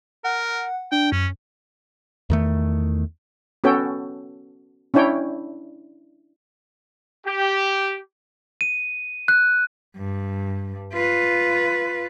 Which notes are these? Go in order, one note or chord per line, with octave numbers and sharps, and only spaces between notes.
A#4 F#5
D4 G5
F#2 C#4
E2 D#3 A3
B3 C#4 F#4 A4 C#5 G5
C#4 D4 E4 C#5 G5
G4
D#7
F#6
G2
F4 B4